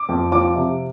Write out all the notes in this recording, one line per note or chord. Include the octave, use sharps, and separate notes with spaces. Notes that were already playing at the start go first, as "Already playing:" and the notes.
Already playing: D6
F2
F3 D6
C3